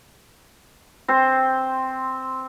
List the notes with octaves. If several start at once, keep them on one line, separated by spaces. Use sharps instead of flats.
C4 C5